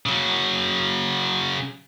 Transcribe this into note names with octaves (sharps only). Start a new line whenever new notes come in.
C#3 F#3